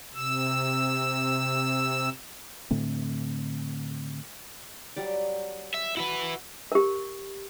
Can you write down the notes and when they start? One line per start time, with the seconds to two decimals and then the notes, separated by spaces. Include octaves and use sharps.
0.15 C3 E6
2.71 A2 D3 A3 C4
4.96 F#3 G3 D5
5.74 E5
5.97 E4 F#4 B4 A5
6.72 G4 A#4